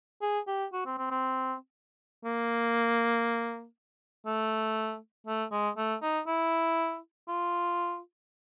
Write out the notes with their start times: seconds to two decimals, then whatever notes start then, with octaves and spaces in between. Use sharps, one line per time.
0.22 G#4
0.47 G4
0.73 F#4
0.86 C4
0.98 C4
1.11 C4
2.24 A#3
4.26 A3
5.27 A3
5.52 G#3
5.77 A3
6.02 D#4
6.27 E4
7.28 F4